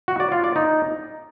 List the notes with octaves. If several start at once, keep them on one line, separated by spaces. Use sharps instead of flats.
F#4
D5
F4
D5
D#4